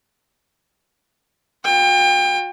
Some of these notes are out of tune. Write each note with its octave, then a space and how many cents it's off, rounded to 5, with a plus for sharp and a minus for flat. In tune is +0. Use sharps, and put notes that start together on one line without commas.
F#4 -45 G5 +35